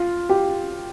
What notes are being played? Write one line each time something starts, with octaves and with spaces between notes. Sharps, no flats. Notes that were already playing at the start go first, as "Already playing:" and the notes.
Already playing: F4
G4